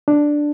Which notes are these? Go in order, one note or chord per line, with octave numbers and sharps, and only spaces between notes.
D4